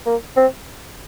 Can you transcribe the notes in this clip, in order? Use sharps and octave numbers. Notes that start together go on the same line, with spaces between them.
A#3
C4